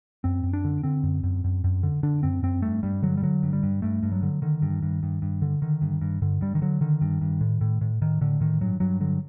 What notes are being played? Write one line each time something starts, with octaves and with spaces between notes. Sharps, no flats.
F#2 C4
F#2
D4
D3
D3 C4
F#2
F#2
F#2
F#2
D3
D3 D4
F#2 C4
F#2 C4
G2 A3
G2 G3
D3 F#3
G3
D3 F#3
G2
G3
G2
G2 A3
G2
F#3
D3
D3 D#3
G2
G2
G2
G2
D3
D3 D#3
G2
G2
G2 D3
G2 G3
D#3
D3 F#3
D3 D#3
G2
G2
A2
A2
A2
A2 D#3
A2 D3
A2 D#3
G2 F#3
G2 F#3
D3 F#3